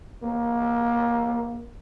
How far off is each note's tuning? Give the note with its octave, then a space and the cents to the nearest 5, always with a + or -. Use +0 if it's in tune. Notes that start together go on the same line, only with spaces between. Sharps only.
A#3 +20